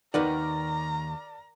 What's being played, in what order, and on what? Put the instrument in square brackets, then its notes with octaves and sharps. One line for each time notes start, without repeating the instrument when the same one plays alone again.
[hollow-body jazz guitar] D#2 B4 F#5 [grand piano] D#3 [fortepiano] A#4 D5 [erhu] A#5